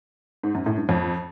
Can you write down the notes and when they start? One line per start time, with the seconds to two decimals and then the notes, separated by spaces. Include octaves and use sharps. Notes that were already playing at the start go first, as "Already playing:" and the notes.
0.43 G#2
0.55 F#2
0.66 A2
0.77 G2
0.89 F2